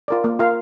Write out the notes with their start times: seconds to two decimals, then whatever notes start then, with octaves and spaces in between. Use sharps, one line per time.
0.08 F4 A#4 D5
0.24 A#3
0.39 F4 A#4 F5